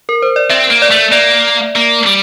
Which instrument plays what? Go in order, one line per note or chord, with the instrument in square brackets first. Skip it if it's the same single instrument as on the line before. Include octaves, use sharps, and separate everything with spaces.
[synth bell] A#4
C5
D5
[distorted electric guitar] C4 [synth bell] E5
[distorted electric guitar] A#3
[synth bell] D5
[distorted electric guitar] A3
[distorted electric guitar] A#3 [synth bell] D5
[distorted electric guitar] A#3
G3